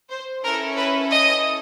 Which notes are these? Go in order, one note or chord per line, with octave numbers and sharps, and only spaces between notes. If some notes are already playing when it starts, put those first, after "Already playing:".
C5
C#4 E4 A4 A#4
B4
D#5